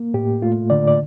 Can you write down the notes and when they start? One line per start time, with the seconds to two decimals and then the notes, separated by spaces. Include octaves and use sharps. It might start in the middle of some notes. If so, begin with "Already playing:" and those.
Already playing: A#3
0.14 A2 G4
0.42 A3 F4
0.70 D3 D5
0.87 D5